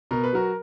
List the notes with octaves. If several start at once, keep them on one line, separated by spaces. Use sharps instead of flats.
B2 A#4
B4
F#3 F#4 A#4